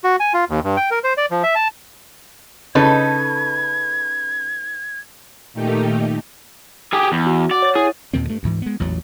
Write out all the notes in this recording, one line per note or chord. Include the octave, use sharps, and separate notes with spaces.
F#4
G#5
F4
D#2
G2
G5
A#4
C5
D5
F3
E5
A5
C#3 D#4 A4 B4 G#6
A#2 D#3 A3 D#4 G4
G4 G#4
E2
F#4
D5 F#5
C#5 A6
E4 G#4
D#2 A#2 D#3 C4
G2 A3
D2 G#2 E3
G#3 B3
A1 E2 A#2 F#3